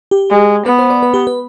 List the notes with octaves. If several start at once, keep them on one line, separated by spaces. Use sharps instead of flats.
G4
G#3
B3 B4
C5
D5
B4
G4
B4